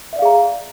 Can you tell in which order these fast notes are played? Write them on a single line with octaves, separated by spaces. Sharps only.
E5 D5 F5 G#4 A#5